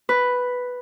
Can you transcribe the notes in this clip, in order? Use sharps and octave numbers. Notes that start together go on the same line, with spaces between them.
B4